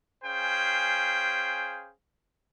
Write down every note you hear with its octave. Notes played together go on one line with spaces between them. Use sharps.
C#4 G#4 C5 F5 G5